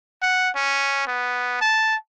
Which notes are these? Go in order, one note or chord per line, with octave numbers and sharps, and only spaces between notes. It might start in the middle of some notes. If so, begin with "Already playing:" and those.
F#5
C#4
B3
A5